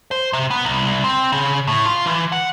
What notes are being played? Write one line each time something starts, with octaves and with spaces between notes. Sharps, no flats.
C5
C3
B3
C2
C4
C#3
A2
F4
E3
F#5